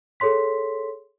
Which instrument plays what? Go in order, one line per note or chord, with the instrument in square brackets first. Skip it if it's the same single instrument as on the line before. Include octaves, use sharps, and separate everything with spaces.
[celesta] G#4 A4 C#5 C6 B6